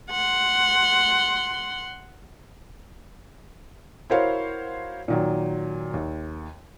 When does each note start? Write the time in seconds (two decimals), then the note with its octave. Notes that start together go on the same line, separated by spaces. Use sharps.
0.10 F#5 C6
4.10 E4 F#4 A#4 C5 C#5 F5
5.08 A#2 D#3 F#3
5.94 D#2